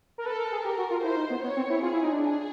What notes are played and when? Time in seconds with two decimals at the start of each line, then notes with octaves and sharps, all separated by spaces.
0.18 A#4
0.25 A4 B4
0.38 A#4
0.52 G#4
0.65 G4 A#4
0.78 F#4
0.90 F4
1.04 E4 C5
1.17 D#4
1.30 B3
1.43 B3 C#5
1.56 C4
1.70 E4
1.82 F4 G#4
1.93 E4
2.03 D#4
2.12 D4
2.22 G#4